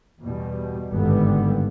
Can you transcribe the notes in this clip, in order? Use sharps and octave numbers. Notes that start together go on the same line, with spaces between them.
E2 B2 G3
G#1 G2 D3 G3 B3